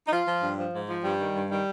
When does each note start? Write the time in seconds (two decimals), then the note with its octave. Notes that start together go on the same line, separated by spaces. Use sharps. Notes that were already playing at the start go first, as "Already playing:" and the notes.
0.06 D#4
0.12 F3 F4
0.27 F3
0.43 G2
0.58 F3
0.73 G#2
0.88 F3
1.03 G2 G3
1.19 D#3
1.34 G2
1.49 D#3 G3